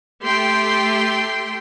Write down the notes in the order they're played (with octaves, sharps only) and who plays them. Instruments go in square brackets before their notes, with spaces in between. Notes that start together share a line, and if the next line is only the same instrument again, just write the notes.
[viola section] A3 G4 G5 C6